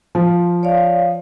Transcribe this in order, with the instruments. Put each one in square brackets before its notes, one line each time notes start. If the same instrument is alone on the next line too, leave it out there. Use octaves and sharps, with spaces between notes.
[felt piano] F3
[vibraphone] C#5 D5 F5